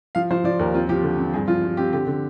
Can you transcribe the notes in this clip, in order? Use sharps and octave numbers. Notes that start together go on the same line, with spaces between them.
F3 F5
F3 C5
F3 D5
D#2 A#4
C4 F4
F3 G4
D3
C4
G2 G#4
F3 F4
F3
C4 G4
D3 G4
D3